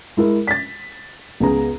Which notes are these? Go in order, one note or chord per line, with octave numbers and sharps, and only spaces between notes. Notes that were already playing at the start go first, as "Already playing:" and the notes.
G#3 E4 A#4
A6 B6
C#2 B3 G#4 A#5